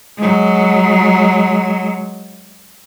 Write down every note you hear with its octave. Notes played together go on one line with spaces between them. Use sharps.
F#3 G#3